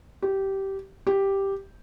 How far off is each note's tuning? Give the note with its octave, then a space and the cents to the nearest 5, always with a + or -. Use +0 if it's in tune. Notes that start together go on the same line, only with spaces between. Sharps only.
G4 -15
G4 +0